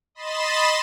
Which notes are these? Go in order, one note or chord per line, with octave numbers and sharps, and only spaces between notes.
D#5 B5 C6 A6 E7